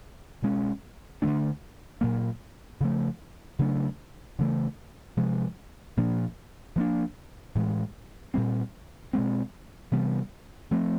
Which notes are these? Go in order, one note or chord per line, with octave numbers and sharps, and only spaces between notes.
B2 G#3 C#4
D3 F3 A3 D4
A#2 F#3 A#3
C#3 F3 A3
C#3 F#3 A3 D4
C#3 E3 A3
C3 F3 G#3
A#2 F3 A#3 D4
F3 A#3 D4
A2 E3 G#3
A#2 G3 C4
B2 G#3 C4
C3 E3 G3 B3
F3 A3 C4